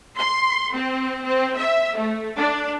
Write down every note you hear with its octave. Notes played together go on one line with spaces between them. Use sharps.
C6
C4
C4
E5
A3
D4